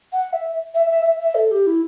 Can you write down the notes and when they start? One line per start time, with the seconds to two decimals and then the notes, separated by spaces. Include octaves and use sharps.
0.13 F#5
0.33 E5
0.74 E5
0.90 E5
1.05 E5
1.20 E5
1.35 A4
1.51 G4
1.67 E4